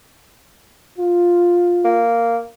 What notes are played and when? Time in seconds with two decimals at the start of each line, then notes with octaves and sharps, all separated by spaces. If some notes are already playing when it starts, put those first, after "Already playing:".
0.98 F4
1.85 A#3